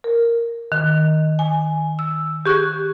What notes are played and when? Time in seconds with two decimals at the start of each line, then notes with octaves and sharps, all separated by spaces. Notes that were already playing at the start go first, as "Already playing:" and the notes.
0.04 A#4
0.72 D#3
1.39 G#5
1.99 E6
2.46 G4 G#4 C#6 F#6